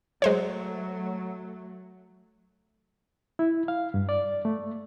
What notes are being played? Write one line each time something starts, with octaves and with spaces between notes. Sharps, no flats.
F#3 G#3 A3 C5 C#5
E4
F5
G2
D5
A3